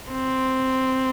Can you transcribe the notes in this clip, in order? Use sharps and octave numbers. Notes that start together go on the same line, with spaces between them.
C4